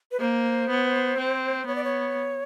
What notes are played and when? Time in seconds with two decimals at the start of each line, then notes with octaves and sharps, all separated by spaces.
0.12 B4
0.20 A#3 C5
0.69 B3
1.18 C4
1.66 B3 C#5
1.75 D5
1.84 C#5